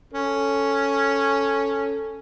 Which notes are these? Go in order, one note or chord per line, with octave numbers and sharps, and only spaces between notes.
C#4 A4